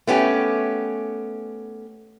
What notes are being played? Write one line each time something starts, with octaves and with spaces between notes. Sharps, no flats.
A3 B3 C#4 G4